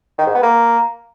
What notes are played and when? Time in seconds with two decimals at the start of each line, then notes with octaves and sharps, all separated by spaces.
0.19 D#3
0.27 G#2
0.35 B3
0.43 A#3